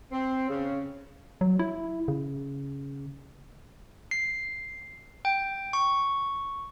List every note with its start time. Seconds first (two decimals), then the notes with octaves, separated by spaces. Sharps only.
0.12 C4
0.49 C#3
1.41 F#3
1.59 E4
2.08 C#3
4.11 C7
5.25 G5
5.73 C#6